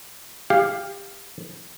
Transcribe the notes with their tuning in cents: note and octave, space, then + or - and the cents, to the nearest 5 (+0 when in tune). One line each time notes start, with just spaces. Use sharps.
G4 +25 F5 +0